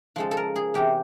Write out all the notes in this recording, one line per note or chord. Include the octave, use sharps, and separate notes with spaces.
C#3 F3 G#3 A4
A4
A#4
G#4
E2 C3 E3 G4